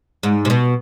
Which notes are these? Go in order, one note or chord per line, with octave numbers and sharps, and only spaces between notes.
G#2
C3
B2